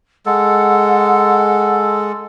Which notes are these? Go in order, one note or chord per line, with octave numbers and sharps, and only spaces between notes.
G#3 A4 F#5